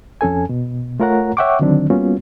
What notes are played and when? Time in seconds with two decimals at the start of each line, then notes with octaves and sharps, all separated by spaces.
0.21 F2 C#4 A4 G#5
0.49 B2
1.00 A3 F4 A#4 C#5 F#5 A#5
1.37 C#5 E5 F#5 G5 C#6 D6
1.59 D3 D#3 F#3 C4 D4
1.90 G3 A#3 B3 C#4 F4 F#4